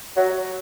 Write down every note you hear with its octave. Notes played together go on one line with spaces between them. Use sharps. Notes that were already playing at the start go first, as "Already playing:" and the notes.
F#3